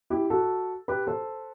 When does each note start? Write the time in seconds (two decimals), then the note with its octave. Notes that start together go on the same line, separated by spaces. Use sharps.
0.10 E4 G4
0.30 F#4 A4
0.88 G4 B4
1.07 A4 C5